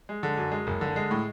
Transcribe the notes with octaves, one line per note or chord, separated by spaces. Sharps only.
G#3
D3
F#2
G#3
F#1
D3
G#3
A2